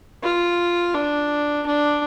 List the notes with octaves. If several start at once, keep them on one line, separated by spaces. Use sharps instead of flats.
F4
D4
D4